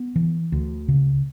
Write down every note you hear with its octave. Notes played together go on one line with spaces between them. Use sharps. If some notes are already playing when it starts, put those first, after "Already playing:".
Already playing: B3
E3
D2
C#3